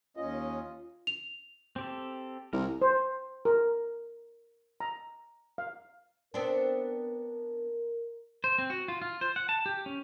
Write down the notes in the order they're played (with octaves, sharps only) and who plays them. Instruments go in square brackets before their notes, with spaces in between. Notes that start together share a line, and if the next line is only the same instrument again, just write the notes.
[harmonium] D#2 C#4 D#5 [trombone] F4
[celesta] F7
[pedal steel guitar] C4 G4 A4
[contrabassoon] C2 [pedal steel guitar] A#4
[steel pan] C5
A#4
A#5
F5
[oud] B3 C4 D4 [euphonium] A#4
[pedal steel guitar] C5
C4
F#4
F4
F4
C5
F#5
A5
G4
C#4